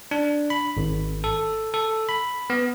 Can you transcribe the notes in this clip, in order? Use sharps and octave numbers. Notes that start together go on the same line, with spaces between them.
D4
B5
G#1
A4
A4
B5
B3